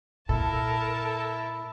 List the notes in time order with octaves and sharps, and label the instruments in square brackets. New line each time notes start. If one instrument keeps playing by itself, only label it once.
[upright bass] A#2 [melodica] E4 [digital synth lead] A4 [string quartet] A#4 A5